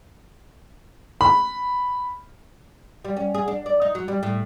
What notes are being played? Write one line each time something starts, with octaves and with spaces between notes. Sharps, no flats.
B5
G3
C#4
G#4
D4
D5
D#4
F#3
G3
A2